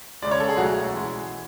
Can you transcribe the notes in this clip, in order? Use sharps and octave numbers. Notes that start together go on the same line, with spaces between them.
C#2 C#3 G#3 D5
C#5
A4
G#4
B1 B2 A3 F#4
E3 G#3